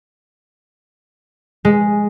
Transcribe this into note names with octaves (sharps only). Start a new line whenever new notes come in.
G#3